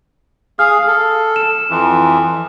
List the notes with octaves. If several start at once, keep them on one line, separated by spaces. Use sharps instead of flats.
G#4 F5 F6
A4
E7
F2 E3